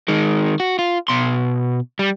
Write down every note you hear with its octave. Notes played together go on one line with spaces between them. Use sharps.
D#3 G#3
F#4
F4
B2 C6
G3